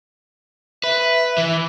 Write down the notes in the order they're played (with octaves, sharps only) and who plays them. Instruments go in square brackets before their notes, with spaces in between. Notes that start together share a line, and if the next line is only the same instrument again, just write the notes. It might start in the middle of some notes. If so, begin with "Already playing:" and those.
[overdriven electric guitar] B4 [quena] E5
[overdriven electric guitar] E3